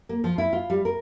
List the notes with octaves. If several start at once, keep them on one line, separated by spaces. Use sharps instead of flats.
A#3
F3
E4
F4
G3
A#4